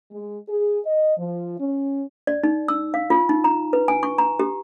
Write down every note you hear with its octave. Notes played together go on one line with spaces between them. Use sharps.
G#3
G#4
D#5
F3
C#4
D5
D#4
E6
F5
F4
D#4
A#5
B4
G#5
C#6
A#5
G4